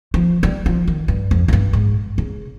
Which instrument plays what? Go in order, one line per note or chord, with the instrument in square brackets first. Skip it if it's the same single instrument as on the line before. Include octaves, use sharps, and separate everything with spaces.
[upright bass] F3
G3
F3
D#3
G2
F2
F2
G2
G#2
C#3